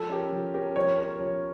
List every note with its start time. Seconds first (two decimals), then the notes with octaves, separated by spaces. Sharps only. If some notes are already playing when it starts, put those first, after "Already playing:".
Already playing: F3 A4
0.09 C#4 G4 A#4
0.32 F3
0.54 C#4 G4 A#4
0.76 F3 C#5
0.98 C#4 G4 A#4
1.20 F3